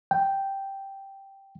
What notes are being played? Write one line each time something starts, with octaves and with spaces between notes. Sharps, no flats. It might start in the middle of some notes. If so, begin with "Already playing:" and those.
G5